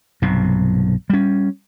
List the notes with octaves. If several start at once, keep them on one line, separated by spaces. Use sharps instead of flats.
B1 G2 C3
G3 C#4